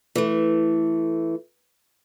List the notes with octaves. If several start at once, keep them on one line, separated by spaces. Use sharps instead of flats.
E3 A3